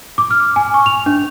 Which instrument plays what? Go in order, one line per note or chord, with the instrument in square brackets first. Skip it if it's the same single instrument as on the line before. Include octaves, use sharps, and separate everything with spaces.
[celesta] D6
F6
G#5
C#6
F7
D4